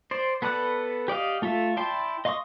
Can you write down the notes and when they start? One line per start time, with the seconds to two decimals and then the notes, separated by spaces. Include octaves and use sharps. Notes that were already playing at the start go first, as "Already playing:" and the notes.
0.11 C5 D5
0.42 B3 A4 B4 D5 F#5
1.08 G4 D5 D#5 F5
1.42 A3 F4 A4 E5
1.77 E4 D5 G5 A5 C6
2.25 D#5 F5 C6 C#6 D#6